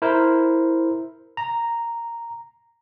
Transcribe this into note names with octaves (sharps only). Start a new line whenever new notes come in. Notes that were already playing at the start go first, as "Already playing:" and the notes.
E4 A#4 C5
A#5